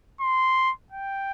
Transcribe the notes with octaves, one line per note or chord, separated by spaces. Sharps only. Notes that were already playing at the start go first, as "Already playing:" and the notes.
C6
G5